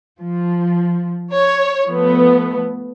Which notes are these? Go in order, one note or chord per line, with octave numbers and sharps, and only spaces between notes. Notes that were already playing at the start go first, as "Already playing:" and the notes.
F3
C#5
F3 A3 B3